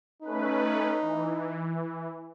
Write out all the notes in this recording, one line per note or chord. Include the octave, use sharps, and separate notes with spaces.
A3 C#4 D#4 B4
E3